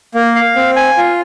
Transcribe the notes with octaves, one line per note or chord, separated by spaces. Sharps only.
A#3
F5
C4
G#5
F4